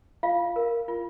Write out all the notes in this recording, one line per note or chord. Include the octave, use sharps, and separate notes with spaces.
F4 F5
A#4
F4